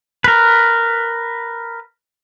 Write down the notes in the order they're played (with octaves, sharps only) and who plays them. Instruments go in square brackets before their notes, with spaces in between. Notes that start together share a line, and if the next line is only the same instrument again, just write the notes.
[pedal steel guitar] A#4 B4